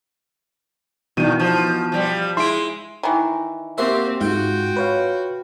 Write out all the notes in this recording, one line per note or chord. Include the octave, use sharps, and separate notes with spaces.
G2 B2 D#3 E3 D#7
F3
F3 G3
G#3 E4 C6 D7
D#3 E3
A#3 C4 F#4 G4 C5 E5
G#2 F4 F#4 G5
B4 C#5 F5